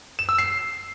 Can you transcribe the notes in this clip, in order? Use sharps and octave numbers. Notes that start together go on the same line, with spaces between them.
E7
E6
C7